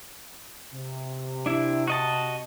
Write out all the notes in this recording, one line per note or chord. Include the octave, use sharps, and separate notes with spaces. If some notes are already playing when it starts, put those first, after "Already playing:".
C3
D4 E4
F#4 D#5 A5